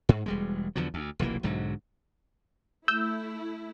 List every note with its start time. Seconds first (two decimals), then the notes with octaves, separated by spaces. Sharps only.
0.09 G#2
0.26 E1 G3 G#3
0.76 E2 D3 F3 F#3
0.94 D2
1.19 F1 B1 E3 A#3
1.43 B1 G#2 D3 F#3
2.88 A3 E4 E6 G6